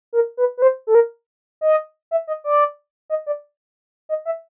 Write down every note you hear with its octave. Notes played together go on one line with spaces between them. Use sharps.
A#4
B4
B4
C5
A4
A#4
D#5
E5
D#5
D5
D#5
D5
D#5
E5